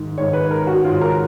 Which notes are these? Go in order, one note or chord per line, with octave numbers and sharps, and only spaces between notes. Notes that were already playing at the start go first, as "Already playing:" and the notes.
Already playing: G#2 D#3
G#2 D#3 C#5
B4
A#4
F#4
G#2 D#3 F4
A#4